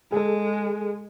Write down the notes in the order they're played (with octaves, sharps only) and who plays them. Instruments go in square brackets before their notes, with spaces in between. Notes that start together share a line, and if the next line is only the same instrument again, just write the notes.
[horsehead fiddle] G#3 [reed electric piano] G#4 A4